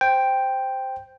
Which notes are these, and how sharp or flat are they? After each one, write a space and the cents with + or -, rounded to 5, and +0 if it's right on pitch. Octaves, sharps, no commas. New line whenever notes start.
C5 +0 G5 +0